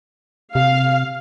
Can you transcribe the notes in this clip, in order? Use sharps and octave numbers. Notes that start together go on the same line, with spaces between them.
C3 F5